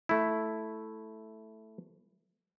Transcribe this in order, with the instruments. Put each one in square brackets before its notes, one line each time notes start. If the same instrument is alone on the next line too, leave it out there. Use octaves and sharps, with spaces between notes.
[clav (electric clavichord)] A3 E4